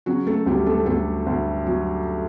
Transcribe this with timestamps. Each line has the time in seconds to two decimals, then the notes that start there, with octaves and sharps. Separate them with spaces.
0.06 C#3 F#3 F#4
0.27 A3 A4
0.46 D2 G3 G4
0.66 A3 A4
0.86 D2 A3 A4
1.26 D2
1.66 F#3